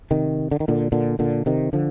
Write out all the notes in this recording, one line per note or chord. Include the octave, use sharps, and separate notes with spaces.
C3 D#3
D3
D#3
A#2 D3
A#2 D3
A#2 D3
C3 D#3
D3 F3